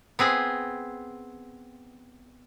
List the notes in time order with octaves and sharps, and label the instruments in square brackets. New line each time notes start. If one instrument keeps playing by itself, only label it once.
[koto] B3 C4 G#4 G#5